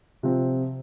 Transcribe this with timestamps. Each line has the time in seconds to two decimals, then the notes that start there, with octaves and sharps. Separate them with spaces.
0.23 C3 F3 C4